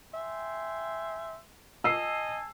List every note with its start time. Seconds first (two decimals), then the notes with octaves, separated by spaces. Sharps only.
0.14 E5 G5 G#5 C6
1.84 D#5 G#5 A5 E6 C7